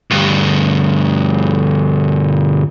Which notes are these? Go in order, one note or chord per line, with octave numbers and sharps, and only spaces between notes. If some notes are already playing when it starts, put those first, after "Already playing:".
D2 G2